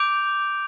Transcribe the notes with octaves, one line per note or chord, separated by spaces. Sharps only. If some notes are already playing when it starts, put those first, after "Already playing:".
Already playing: D6 G6 D7 F7